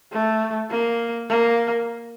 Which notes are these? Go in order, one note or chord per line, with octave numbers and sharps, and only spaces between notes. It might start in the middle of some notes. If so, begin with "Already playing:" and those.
A3
A#3
A#3